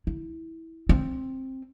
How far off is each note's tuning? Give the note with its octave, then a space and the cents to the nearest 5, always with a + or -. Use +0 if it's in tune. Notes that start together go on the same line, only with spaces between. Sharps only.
E4 -15
C4 +10